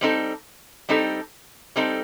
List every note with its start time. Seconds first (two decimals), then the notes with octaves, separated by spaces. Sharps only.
0.01 G3 C4 D#4 A4
0.89 G3 C4 D#4 A4
1.76 G3 C4 D#4 A4